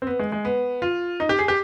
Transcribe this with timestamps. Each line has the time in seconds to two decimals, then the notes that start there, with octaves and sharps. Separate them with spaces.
0.02 C4
0.07 B3
0.19 G#3
0.32 G#3
0.45 B3
0.82 F4
1.20 D#4
1.29 G4
1.39 G#4
1.48 G4